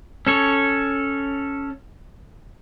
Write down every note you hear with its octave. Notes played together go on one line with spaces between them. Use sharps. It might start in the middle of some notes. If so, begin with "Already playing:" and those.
C#4 A4 C#5